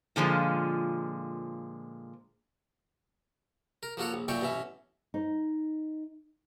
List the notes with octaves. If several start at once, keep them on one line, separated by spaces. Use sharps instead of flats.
A#2 D3 F3 G#3
A#4
F3 A#3 F#4 A4 C#5
A#1
A#2 F#3 A3 D5 G5 C#6
A1 B2 C#4 E5
D#4